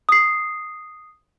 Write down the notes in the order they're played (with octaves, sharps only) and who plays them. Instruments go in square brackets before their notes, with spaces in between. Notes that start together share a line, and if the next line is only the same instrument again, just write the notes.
[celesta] D#6 C7